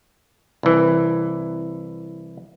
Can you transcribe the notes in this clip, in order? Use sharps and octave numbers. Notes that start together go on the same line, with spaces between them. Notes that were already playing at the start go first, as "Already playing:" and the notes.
C2 E3